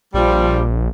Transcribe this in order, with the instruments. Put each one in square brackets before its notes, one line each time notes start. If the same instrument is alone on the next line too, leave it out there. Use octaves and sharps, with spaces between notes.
[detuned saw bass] A#1 [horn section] F3 G3